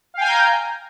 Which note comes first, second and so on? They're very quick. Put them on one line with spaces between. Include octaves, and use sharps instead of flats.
F5 G5 G#5 G6 A#5